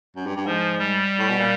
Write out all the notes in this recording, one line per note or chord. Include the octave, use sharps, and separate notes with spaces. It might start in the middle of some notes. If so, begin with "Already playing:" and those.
F#2
G2
G2
G#2 F3
G3
A2
B2
A#2